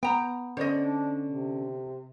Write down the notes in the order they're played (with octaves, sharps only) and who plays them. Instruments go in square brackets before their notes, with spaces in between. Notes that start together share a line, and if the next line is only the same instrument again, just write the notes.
[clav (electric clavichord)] B3 [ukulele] G5 A#5
[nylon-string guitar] D3 C#4 D5 [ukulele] C5 D#5
[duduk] D4
C3